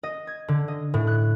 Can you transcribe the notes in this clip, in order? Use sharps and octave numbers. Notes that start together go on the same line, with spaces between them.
D#5
G#6
D3
D#5
A2
F#6